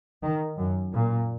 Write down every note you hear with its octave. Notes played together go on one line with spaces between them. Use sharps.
D#3
F#2
A#2